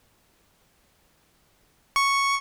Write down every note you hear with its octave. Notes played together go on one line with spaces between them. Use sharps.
C#6